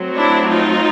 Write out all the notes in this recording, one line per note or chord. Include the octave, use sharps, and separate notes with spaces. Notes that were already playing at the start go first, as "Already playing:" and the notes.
Already playing: F#3 A3 C4
D4 E4
D#4 F4